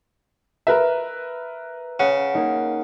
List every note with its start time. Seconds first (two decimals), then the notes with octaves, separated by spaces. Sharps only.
0.67 A#4 B4 E5
2.00 C#3 F#5
2.35 A#3 D#4